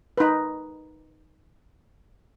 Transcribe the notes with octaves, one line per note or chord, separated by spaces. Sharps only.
D#4 B4